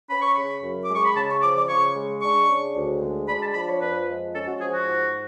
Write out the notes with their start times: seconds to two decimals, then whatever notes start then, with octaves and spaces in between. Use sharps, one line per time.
0.10 C#4 B5
0.22 C#6
0.34 C#3 B5
0.63 F#2
0.85 G#3 D6
0.95 C#6
1.05 B5
1.16 C#3 A5
1.29 C#6
1.42 F3 D6
1.56 D6
1.69 C#3 C#6
1.96 G#3
2.22 D4 C#6
2.49 C#3
2.75 D2
3.02 G#3
3.27 D4 B5
3.42 A5
3.54 F3 B5
3.68 C#5
3.81 F2 B4
4.07 G#3
4.34 C#4 A4
4.47 F#4
4.60 F3 G#4
4.74 F#4
4.86 G#2